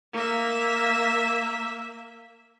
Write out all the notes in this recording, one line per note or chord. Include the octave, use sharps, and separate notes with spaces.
A#3 E5